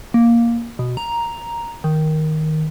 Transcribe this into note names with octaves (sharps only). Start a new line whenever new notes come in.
A#3
B2
A#5
D#3